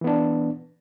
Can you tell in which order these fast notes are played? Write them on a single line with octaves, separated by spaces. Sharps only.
E3 B3 D4